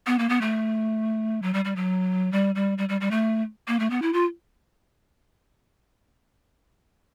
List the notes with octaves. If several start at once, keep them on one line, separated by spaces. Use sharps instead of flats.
B3
A#3
B3
A3
F#3
G3
G3
F#3
G3
G3
G3
G3
G3
A3
A#3
A3
B3
E4
F4